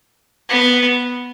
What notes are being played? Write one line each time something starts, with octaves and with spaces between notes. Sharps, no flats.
B3